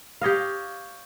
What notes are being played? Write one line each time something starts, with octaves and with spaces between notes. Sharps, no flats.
G4 C#5 D#5 F5